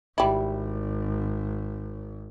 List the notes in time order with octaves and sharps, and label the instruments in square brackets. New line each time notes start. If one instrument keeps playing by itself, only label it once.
[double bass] G#1 [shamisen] G3 E4